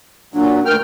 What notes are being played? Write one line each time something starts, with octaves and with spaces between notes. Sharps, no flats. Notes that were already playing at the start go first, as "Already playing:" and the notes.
A#2 F#3 D4
D2 A#4 G5 F6